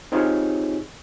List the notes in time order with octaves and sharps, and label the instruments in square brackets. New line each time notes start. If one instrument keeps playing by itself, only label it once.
[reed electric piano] C4 D#4 F4 G4 G#4 C#5